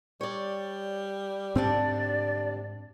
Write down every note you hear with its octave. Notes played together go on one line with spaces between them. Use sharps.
G3 C#5 D5
D2 G#2 C3 C4 D4 D5